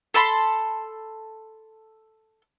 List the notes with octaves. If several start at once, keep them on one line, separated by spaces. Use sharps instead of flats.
A4 A5 B5 C6